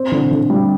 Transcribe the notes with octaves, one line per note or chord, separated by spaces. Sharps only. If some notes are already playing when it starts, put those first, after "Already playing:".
Already playing: C4
D3
D3
G3